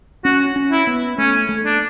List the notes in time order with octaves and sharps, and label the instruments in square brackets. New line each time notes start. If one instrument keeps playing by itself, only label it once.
[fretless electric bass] C#4 [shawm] F#4
[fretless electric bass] C#4
[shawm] E4
[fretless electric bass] B3
[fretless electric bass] A3 [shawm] C#4
[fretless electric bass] A3
[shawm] D4